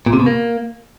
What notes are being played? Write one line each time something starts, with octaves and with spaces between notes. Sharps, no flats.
A#2
C3
B2
A#3